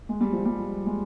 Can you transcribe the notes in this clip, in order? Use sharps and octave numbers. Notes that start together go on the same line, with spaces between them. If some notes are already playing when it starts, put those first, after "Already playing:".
G#3
G3
F3
G3
G#3